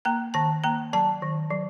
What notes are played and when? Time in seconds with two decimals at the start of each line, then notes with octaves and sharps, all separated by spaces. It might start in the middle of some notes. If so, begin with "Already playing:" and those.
0.05 A#3 A#5
0.34 D#3 A5
0.64 A#3 A#5
0.93 F#3 A5
1.22 D#3
1.50 F#3